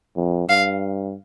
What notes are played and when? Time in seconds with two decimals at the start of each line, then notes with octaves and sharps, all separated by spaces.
0.17 F2
0.49 G2 F5